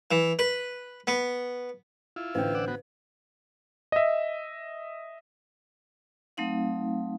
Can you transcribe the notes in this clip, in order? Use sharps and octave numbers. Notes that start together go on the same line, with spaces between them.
E3
B4
B3
E4 F4
A1 D3 B4 C5 G5
D5 F#5 E6
B3 F#4
D#5 E5
F#3 A3 C4 D#4 F5